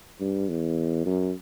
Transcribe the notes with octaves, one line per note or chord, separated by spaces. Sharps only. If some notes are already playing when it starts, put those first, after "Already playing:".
G2
E2
F#2